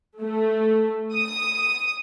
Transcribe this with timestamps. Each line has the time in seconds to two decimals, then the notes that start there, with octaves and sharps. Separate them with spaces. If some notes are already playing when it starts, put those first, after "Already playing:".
0.22 A3
1.13 D#6